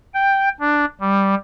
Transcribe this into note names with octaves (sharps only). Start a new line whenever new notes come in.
G5
D4
G3